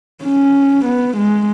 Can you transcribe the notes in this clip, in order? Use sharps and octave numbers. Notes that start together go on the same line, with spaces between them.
C#4
B3
G#3